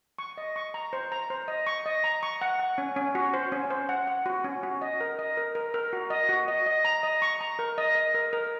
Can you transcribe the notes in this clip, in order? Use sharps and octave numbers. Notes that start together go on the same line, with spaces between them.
C#6
D#5
C#6
A#5
C5
A#5
C5
D#5
C#6
D#5
A#5
C#6
F#5
F#5
C#4
C#4
F#4
C5
C#4
C5
F#5
F#5
F#4
C#4
F#4
D#5
A#4
D#5
A#4
A#4
A#4
F#4
D#5
F#4
D#5
D#5
A#5
D#5
C#6
A#5
A#4
D#5
D#5
A#4
A#4